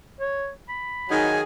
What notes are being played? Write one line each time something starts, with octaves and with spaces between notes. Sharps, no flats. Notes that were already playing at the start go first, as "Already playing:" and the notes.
C#5
B5
D#3 F#3 D#4 G#4 G#5